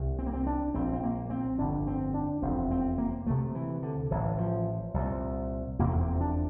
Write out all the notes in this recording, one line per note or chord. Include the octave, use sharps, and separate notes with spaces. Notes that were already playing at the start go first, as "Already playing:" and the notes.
Already playing: C2 C3
C4
A#3
C4
D4
A#1 A#2 C4
C4
A#3
C4
G1 F2 D3 D4
C4
D4
F1 E2 C3 C4
C4
A#3
D2 C3 A3
E3
D3
A1 A2 E3
F3
C2 A#2
F1 E2 C3 A#3
C4
D4